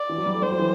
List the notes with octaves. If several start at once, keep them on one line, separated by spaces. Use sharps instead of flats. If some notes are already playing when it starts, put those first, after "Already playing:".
Already playing: D5
E3
F#3
G3
A3
G3 C5
F#3
E3